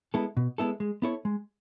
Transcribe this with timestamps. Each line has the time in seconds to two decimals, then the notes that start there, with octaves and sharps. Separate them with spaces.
0.14 G#3 B3 E4 A4
0.37 B2
0.58 G#3 B3 E4 A4
0.80 G#3
1.02 B3 E4 A4 C#5
1.25 G#3